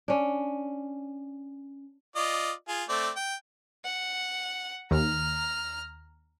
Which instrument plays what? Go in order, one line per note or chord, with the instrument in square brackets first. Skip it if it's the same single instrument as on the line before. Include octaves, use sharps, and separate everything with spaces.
[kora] C#4 D4
[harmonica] F4 D5 D#5
F4 G#4
A3 C4 D5
G5
[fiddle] F#5
[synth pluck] D#2 [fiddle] A#5 F6